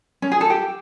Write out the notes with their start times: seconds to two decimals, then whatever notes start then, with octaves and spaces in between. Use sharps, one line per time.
0.22 C#4
0.32 G#4
0.41 A4
0.50 G4